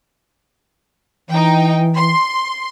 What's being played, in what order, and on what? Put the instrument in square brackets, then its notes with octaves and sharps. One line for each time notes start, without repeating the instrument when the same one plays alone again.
[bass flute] E3 [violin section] D#4 G5
[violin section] C6